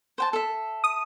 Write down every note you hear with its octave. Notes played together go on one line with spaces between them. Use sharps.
C5 G5 A5
A4 E5
D#6